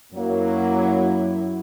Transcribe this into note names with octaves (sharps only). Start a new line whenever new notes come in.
F#2 F#3 A#3 E4